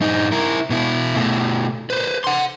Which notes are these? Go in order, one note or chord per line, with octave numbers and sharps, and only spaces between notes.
G2 D#4
E4 A#4
B2 E4
B2 A3
B4 C5
F#5 C6